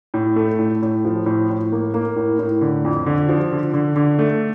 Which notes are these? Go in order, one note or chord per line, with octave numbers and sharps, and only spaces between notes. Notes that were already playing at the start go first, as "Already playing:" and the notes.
A2
A3
A2
A2
F3
A2
A2
A#3
A#3
A2
A2
D3
F2
D3
F3
D3
D3
D3
A3